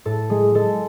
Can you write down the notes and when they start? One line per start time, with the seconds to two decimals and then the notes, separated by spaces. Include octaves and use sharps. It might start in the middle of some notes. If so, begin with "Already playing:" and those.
0.05 A2 A4
0.30 G#3 G#4
0.55 G#3 A4